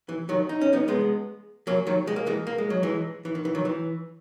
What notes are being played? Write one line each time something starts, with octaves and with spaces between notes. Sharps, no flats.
E3
D#3 F#3
D#4
C#4
B3 D#4
G#3 B3
F#3 A#3
D#3 F#3
G#3
A#3
E3 G#3
A#3
G#3
F#3
E3 G#3
E3
D#3
E3
D#3 F#3
E3